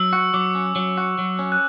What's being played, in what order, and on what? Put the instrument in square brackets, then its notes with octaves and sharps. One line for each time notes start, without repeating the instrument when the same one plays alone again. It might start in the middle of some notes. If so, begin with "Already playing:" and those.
Already playing: [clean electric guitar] F#3 [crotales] E6
[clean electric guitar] F#4
[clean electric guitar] F#3 [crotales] D6
[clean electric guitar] C#4
F#3
F#4
F#3
C#4
[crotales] F#6